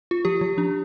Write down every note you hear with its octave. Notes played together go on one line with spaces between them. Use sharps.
F4
F3 G4
F3
D4